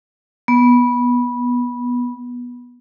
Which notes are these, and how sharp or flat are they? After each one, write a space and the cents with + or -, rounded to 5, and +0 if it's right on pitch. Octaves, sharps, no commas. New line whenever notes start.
B3 -15